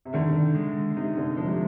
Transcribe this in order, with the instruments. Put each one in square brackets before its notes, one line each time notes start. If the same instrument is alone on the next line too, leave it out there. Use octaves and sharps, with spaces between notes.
[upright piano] C3
[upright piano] D3 [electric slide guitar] D#3
[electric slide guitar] G#3
[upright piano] C3 [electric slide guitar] D#4
[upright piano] D3
[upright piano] F3 [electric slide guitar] G#3
[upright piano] G3